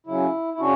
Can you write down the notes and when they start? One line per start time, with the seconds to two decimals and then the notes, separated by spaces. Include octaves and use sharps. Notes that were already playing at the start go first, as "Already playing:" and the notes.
0.07 C#3 F#3 C#4 E4
0.54 E4
0.60 C#3 C#4 D4 F#4